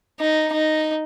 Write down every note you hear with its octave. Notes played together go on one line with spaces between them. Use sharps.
D#4
D#4